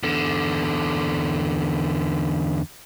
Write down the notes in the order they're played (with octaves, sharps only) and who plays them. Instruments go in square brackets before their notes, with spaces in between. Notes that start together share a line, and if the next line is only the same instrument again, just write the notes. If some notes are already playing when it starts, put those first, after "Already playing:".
[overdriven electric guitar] E2 D3